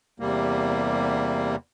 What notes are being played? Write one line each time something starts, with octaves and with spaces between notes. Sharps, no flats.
E2 C3 G3 A#3